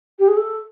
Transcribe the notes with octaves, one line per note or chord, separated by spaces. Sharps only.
G4
G#4
A4